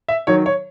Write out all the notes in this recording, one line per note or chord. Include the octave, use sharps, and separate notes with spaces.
E5
D#3 F#3 C#5
C#5